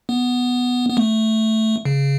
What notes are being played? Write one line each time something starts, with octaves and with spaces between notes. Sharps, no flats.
B3
B3
A3
C#3